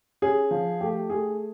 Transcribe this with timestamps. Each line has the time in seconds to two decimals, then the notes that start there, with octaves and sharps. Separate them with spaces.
0.22 C#4 G#4
0.51 F3
0.81 A3 G4
1.10 A3 G#4